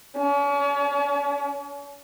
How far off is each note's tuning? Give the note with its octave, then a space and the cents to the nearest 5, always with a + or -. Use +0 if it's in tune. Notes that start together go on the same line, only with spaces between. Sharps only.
C#4 +40